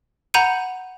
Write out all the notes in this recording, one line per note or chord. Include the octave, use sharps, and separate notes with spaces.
F#5 A#5 B5 G6 C#7 D#7